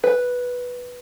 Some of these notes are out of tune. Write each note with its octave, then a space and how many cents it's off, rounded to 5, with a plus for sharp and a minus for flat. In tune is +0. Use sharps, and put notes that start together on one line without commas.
B4 -5